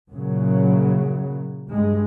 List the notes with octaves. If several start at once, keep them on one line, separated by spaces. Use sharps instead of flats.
F#2 A#2 C#3 F#3
G2 G#3